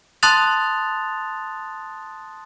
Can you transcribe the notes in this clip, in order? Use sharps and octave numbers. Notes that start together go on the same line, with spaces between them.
A5 C6 D#6 F#6 A6 F7